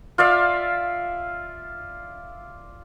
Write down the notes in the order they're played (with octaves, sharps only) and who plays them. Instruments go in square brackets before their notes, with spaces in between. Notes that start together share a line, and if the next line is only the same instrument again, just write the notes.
[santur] F4 D5 E5 F5